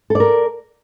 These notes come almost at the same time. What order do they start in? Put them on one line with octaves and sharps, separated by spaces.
A4 D5 A#4